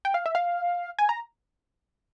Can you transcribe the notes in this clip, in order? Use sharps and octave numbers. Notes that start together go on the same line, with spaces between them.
G5
F5
E5
F5
G#5
A#5